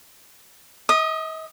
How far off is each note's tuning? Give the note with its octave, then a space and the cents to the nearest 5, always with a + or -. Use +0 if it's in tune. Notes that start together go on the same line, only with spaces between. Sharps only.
D#5 +45 D#6 -15